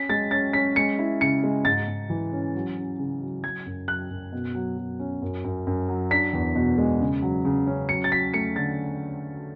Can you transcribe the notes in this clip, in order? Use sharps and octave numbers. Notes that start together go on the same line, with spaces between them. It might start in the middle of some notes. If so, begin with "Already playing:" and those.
Already playing: C#4 B6
G#3 A6
C#4 A6
C#4 B6
G#3 C#7
E4
C#3 C#7
G#3
G#2 A6
G#2
E3
C#4
F#3
C#4
C#3
F#3
F#3 G#6
F#2
F#3 F#6
F#2
B2
F#3
F#3
C#4
F#2
F#2
F#2
F#3
D4 B6
E2
B2
G#3
C#3
F#3
C#3
C#4
F#3 C#7
A6
F#3 B6
A3 C#7
D3 A6